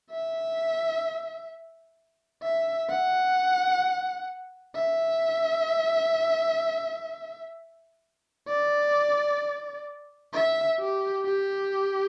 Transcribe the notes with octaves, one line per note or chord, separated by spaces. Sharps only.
E5
E5
F#5
E5
D5
E5
G4
G4